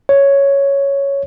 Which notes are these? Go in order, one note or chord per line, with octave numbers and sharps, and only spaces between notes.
C#5